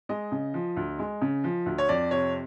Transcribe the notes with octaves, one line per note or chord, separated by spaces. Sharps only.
G#3 D#5
C#3
F3
D2
G#3
C#3
F3
D2
C#5
F2 D5
C3 C#5